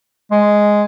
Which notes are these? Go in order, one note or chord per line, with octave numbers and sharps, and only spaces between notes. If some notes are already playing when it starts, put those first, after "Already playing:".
G#3